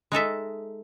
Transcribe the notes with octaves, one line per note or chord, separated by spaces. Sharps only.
G#3 D#4 A4 E5